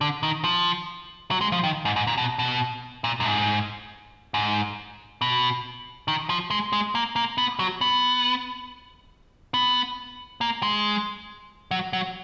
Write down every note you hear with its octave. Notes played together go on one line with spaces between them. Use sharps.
D3
D#3
F3
F#3
G#3
F3
D#3
G#2
G#2
A#2
B2
B2
A#2
F#2
G#2
G#2
B2
D#3
F3
G#3
G#3
A#3
A#3
B3
F#3
B3
B3
A#3
G#3
F#3
F#3